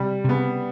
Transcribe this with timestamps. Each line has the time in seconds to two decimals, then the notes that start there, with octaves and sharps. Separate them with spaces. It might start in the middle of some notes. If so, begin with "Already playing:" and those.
Already playing: C3 G3
0.24 C3
0.29 C#3 B3